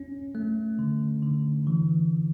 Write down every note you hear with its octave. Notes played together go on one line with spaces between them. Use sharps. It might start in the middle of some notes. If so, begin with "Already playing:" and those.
Already playing: C#4
A3
D3
D3
E3